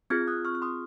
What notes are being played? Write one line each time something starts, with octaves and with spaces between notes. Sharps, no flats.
C4 F4 G#4 F6 G#6
D#6 F#6
C#6 F6
F6
C6 D#6